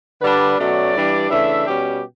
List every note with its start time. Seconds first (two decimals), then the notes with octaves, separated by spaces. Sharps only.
0.22 D3 G3 D4 B4
0.58 B2 F#3 A3 C#4 D5
0.94 G2 E3 G3 D4
1.30 C#3 E3 A3 D4 E5
1.66 B2 G3 C#4 G4